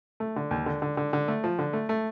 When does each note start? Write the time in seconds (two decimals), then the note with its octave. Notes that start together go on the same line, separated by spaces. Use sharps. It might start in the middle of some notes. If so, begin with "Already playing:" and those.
0.20 A3
0.36 D3
0.51 D#2
0.66 D3
0.82 D3
0.97 D3
1.13 D3
1.28 A3
1.44 F3
1.59 D3
1.73 A3
1.89 A3